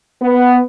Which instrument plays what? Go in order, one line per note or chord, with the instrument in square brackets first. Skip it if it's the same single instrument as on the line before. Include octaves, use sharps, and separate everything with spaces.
[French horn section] B3